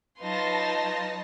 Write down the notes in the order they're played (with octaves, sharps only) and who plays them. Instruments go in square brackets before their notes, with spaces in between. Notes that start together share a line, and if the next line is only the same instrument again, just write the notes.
[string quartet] F#3 D#4 B4 [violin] F4 C6 [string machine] A5 A#6